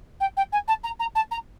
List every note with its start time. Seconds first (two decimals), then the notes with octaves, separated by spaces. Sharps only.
0.20 G5
0.37 G5
0.52 G#5
0.68 A5
0.84 A#5
1.00 A#5
1.15 A5
1.31 A#5